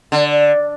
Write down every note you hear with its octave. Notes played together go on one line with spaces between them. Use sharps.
D3